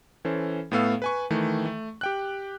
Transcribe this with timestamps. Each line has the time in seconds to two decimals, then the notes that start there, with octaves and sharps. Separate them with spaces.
0.25 E3 C#4 A4 C5
0.71 A2 A3 B3 A4 F5 E6
1.02 B4 G#5 C#6
1.30 D#3 E3 A3
1.65 A3
2.01 G4 G5 F#6